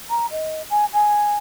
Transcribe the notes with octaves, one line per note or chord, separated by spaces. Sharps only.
A#5
D#5
G#5
G#5